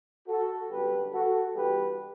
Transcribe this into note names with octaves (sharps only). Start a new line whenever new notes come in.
F#4 A4
F#2 D3 G3 B3 G4 B4
F#4 A4
G2 E3 G3 B3 G4 B4